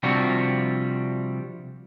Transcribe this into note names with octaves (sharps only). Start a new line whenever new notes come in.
C3 F3 G3 D4 F4 F#4